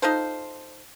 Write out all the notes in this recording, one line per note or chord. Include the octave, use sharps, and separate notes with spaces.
D#4 F4 A4 C5